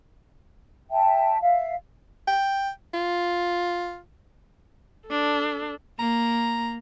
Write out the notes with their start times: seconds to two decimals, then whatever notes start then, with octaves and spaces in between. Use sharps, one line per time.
0.91 E5 G5 A5
1.41 E5 F5
2.27 G5
2.94 F4
5.07 D4 A4
5.99 A#3 A#5